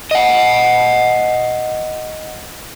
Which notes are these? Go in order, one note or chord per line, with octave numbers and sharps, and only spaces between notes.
D#5 F#5